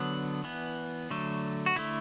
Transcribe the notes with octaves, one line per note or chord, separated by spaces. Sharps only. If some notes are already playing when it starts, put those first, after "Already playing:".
Already playing: D3 F#3 B3 D4
E3 B3
D3 F#3 A3
F#4
D3 A3 E4